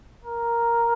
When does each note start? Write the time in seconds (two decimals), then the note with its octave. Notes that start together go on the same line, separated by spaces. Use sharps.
0.24 A#4